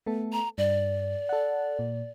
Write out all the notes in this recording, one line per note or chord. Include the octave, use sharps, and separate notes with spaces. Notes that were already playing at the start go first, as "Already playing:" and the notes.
A3 B3 A4
A#5
G2 D5
A4 F#5
A#2